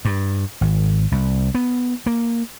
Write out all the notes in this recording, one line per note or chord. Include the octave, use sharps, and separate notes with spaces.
G2
G#1
C2
B3
A#3